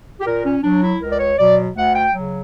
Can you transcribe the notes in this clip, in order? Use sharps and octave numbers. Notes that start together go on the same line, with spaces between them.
G4
A#2 A#4
C#4
F#3 D4
E4
C#2 A#4
D5
C#5
B2 F#3 D5
D2 F#5
G5
C#3 F#3